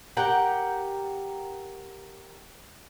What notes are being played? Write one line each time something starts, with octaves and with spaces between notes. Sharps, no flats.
G4 A#4 F#5 G5